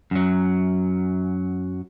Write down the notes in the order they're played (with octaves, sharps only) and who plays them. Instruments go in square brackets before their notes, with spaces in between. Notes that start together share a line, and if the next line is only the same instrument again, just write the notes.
[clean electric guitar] F#2 F#3